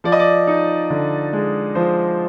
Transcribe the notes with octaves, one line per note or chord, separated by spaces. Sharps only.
F3 D5
D#5
D5
D#4
D3
G#3
F3 C5